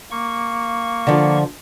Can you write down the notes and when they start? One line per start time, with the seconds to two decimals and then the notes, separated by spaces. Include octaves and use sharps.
0.11 A#3 C#6
1.07 D3 F3